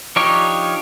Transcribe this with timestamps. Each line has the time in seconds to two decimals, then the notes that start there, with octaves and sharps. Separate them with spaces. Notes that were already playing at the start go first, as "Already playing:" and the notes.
0.16 F3 D4 D#4 G4 C#5